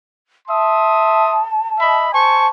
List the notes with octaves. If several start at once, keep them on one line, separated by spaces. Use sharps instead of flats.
E5 A5 C6 D#6
D#5 E5 B5
C5 G#5 A5 C#6